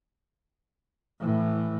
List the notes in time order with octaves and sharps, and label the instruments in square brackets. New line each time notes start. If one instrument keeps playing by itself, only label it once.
[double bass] A2 E3